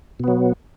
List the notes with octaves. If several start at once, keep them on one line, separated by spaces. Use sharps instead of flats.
B2 F#3 B3